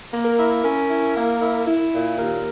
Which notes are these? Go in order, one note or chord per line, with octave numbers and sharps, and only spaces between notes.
A#3
A#4
E4
C#4 A#4
E4
A#3
E4
E4
A#2
D#2 A#4